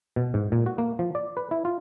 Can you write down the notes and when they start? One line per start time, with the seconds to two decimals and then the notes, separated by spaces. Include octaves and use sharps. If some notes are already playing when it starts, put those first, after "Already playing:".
0.16 B2
0.34 G#2
0.52 A#2
0.66 F#4
0.78 A#3
0.99 F3
1.15 D5
1.37 B4
1.51 E4
1.65 F4